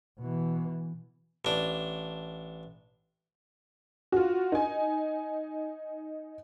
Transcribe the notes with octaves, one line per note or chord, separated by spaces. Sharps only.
B2 E3
A1 D4
F4 F#4
D#4 G#5